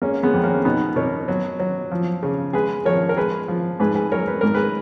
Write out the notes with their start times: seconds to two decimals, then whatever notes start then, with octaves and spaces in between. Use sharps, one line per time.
0.02 G#3 A#3 C#4
0.23 G#3 B3
0.34 F2
0.44 A#3 C#4
0.65 B2 B3 D#4
0.96 B2 A#4 C#5
1.28 F#3
1.59 F#3
1.92 F3
2.23 C#3
2.53 G#3 G#4 B4
2.85 F3 A#4 C#5
3.09 A#4
3.17 G#3 G#4 B4
3.48 F3
3.80 G#2 G#4 B4
3.95 G#4 B4
4.12 F#3 A#4 C#5
4.28 B4
4.41 G#2 A#4
4.54 G#4 B4